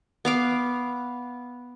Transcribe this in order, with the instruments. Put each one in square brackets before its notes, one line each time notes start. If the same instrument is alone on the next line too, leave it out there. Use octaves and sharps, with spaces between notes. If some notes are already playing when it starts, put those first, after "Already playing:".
[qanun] B3 F5 D6